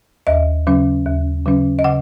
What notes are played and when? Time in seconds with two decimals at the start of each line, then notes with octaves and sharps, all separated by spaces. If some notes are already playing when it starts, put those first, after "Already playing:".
0.27 D#2 D#5
0.67 C#3 F#3 C#4
1.06 D#2
1.46 C#3 F#3 C#4
1.79 D#5
1.84 C#3 F#5